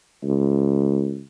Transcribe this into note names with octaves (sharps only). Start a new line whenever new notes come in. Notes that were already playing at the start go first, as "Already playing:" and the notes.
C#2